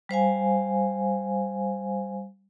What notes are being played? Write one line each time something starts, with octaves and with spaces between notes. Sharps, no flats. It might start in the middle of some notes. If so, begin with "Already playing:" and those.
G3 C5 F5 G#5